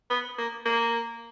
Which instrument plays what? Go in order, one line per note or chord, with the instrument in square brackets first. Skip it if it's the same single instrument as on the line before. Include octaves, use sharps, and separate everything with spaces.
[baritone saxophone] B3
A#3
A#3